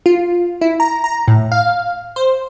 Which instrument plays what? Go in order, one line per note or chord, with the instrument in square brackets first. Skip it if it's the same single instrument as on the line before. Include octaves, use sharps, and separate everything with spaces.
[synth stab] F4
E4
A#5
A#5
A2
F5
C5